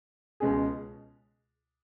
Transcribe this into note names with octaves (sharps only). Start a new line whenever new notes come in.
C#2 B2 G#3 C#4 G#4